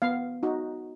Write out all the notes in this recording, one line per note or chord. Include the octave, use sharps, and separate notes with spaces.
B3 F5
D#4 F#4